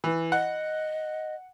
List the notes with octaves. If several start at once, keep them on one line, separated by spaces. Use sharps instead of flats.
E3
D#5 F#5